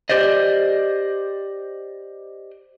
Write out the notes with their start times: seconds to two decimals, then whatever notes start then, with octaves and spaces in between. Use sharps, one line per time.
0.09 G4 C5 D5 D#5